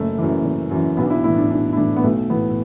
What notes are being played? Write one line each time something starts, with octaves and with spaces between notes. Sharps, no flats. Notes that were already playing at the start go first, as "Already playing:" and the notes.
Already playing: F#1 A3
F#2 E3
F#1
F#2 E3
B1 B3
D4
E4
A2 E3 E4
D4
B1 D4
E4
A2 E3 D4
B3
B1 A3
A2 E3 B3